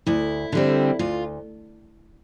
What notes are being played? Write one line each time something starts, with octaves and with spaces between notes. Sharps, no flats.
D2 E4
D3 G3 C4
D2 F4